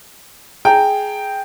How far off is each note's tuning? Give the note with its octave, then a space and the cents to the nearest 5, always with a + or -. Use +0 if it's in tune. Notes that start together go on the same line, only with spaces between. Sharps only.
G#4 +10 G5 +0 A#5 -25